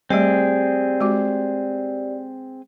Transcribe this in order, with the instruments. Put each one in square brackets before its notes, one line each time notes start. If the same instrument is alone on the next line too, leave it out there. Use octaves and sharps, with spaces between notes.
[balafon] G3 A3 [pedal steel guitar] C4 G#4 [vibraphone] G4 D5
[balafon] G#3 F#4